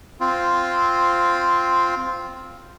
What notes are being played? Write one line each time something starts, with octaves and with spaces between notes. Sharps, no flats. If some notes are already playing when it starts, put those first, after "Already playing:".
C4 F4